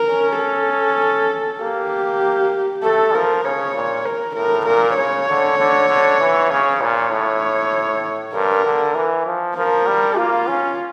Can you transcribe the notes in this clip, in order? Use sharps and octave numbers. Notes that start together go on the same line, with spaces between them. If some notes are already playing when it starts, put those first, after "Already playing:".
Already playing: A#4
C#4
A4
A#3 G4
A3 A4
F3 A#4
C#3 C#5
A#2
A#4
A2 A#4
A#2 A#4
C#3 C#5
D3
D3
D3
E3
C#3 C#5
A#2 C#5
A2
G2 A#4
D3
E3
F3
F3 A#4
G3
A#3 F4
C#4